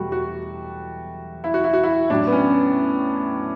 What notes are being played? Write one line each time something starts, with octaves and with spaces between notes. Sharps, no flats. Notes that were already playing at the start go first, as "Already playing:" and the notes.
Already playing: E2 B2 F#3 G3 A3 F#4
F#4
E4
F#4
E4
F#4
E4
A2 F#3 D4
B3
C#4